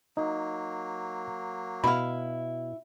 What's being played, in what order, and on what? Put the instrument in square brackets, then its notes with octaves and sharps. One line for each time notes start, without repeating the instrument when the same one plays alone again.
[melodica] F#3 A#3 [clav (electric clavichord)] D#4
[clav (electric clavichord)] B2 [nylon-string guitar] E4 F5 [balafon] B5